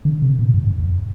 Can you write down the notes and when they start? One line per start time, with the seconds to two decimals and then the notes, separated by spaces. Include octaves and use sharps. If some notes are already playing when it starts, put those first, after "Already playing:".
0.05 D3
0.22 C3
0.39 A#2
0.54 G2
0.67 G2
0.80 F2